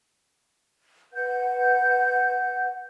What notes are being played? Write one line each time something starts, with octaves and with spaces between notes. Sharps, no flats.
B4 F#5 G6